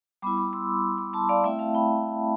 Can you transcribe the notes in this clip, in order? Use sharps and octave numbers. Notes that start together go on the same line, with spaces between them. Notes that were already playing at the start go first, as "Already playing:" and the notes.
G3 B3 E4 B5 D6
B5 D6
C6 E6
B5 D6
A5 C6
D5 F5
A3 C4 E4 E5 G5
F5 A5
G5 B5